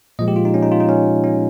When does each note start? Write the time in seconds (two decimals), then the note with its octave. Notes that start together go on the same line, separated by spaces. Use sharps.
0.19 A#2 F3 G#3 D#5
0.28 G4
0.36 F4
0.45 D#4
0.54 C#4
0.63 D#4
0.72 F4
0.80 D#4
0.89 C#4
1.24 C#4